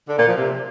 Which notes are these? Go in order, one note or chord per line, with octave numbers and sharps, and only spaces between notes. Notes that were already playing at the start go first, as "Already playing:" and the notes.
D3
A#2
F3
C3